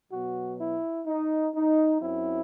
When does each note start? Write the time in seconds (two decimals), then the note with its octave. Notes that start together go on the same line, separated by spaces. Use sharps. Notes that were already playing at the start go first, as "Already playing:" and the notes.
0.12 B2 F#3 B3 F#4
0.59 E4
1.06 D#4
1.54 D#4
2.01 F#2 F#3 C4 E4